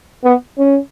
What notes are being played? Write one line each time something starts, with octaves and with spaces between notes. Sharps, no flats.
B3
C#4